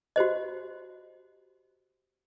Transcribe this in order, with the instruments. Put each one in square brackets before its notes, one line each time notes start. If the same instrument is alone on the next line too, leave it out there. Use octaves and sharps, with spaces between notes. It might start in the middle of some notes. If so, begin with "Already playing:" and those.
[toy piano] F#4 G4 C5 D#5